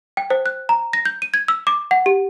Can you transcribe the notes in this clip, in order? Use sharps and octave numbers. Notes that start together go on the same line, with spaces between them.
G5
C5
F#6
A#5
A#6
G6
D#7
G#6
E6
D6
F#5
G4